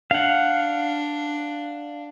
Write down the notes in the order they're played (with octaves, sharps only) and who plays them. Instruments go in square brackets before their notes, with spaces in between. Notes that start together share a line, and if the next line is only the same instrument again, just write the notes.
[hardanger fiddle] D4 [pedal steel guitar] F5 F#5